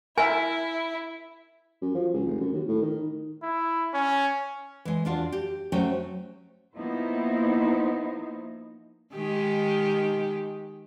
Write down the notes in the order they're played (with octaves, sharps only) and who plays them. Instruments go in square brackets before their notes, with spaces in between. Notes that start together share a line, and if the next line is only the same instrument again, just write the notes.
[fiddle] E4 [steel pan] A#4 E5 [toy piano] G#5
[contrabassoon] F#2
F3
C#2
F1
F#2
D#2
A2
D#3
[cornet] E4
C#4
[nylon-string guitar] E3 G#3
E2 D4 F4 F#4
G4
F#3 A3 C#4 F#4 C5 G5
[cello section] F3 A#3 B3 D#4 E4 C5
[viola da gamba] D#3 G#3 G4